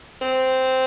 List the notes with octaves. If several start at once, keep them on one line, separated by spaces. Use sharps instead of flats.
C4